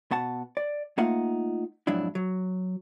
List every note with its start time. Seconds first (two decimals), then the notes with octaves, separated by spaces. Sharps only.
0.11 B2 F#5 A5
0.57 D5
0.98 A3 A#3 D#4 F4 F#5
1.87 F2 G#2 F#3 D4 E4
2.15 F#3